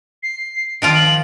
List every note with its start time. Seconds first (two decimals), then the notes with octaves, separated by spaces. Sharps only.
0.23 C7
0.82 D#3 F3 F4 D7
0.95 F#7